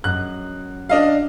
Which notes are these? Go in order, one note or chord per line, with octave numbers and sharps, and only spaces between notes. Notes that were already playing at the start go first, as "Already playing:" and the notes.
F#2 D#5 F#6
D4 D#5 F5